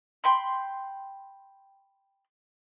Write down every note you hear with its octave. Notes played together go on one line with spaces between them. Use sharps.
G5 B5 C6